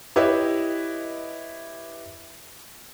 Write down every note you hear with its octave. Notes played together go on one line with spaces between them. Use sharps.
E4 G4 B4 C#5 D#5 E5